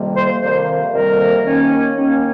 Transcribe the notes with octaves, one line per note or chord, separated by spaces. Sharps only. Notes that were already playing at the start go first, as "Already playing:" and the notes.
Already playing: F2 C3 D#3 G3 A#3
C5
F2 C3 D#3 G3 A#3 C5
F2 C3 D#3 G3 A#3 A#4
D#2 D#3 A#3 C#4
D#2 D#3 A#3 C#4